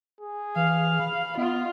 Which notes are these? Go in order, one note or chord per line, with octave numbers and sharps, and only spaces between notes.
G#4
E3 F5
B5
B3 F4 D#5